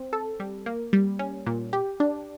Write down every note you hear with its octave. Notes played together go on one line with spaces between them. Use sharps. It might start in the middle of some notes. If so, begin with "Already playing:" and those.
Already playing: C4
A4
G3
A#3
G3
C#4
A#2
G4
D4